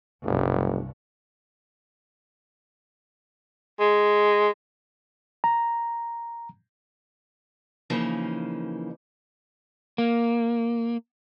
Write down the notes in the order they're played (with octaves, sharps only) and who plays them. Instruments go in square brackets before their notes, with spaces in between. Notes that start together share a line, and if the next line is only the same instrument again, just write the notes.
[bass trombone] F#1 [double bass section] C2 G2
[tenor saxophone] G#3
[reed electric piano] A#5
[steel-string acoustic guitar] C#3 E3 F3 A#3 D#4
[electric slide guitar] A#3